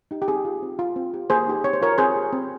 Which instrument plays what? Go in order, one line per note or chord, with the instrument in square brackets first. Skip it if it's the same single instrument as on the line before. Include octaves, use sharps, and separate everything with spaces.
[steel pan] D#4 G4
G4
C4 G#4
F4
C4
F4
C4
G4
A#3 G#4 C5
D#4 G4
C4 C#5
C5
F4 A#4 C#5
C4 G#4 C5
G4
C4